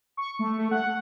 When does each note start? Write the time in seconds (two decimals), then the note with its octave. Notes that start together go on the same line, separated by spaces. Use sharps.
0.17 C#6
0.39 A3
0.58 A3
0.71 F#5